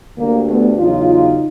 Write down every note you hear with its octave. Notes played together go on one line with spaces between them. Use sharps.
D2 D3 G3 A#3
A3 B3
E2 C#3 F#3 D#4 F4